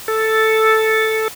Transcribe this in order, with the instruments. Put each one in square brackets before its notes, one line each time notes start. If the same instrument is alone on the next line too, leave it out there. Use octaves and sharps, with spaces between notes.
[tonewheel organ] A4